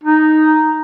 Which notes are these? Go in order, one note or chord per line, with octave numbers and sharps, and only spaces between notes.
D#4